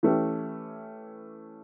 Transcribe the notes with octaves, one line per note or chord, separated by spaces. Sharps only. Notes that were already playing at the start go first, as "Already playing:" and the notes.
E3 A3 C#4 G4